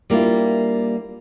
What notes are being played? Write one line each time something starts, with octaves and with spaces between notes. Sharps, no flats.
G3 A#3 D4 E4 F4